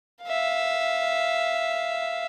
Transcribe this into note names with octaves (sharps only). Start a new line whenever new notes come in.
E5 F5